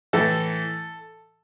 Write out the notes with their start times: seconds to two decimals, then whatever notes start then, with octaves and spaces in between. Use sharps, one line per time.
0.13 A2 E3 A4